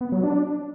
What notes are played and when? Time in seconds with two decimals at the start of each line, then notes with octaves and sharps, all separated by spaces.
0.01 B3
0.12 F#3
0.24 D4